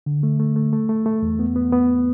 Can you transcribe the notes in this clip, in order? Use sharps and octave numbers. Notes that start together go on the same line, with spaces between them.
D3
A3
A3
A3
A3
A3
A3
E2
B3
B3
B3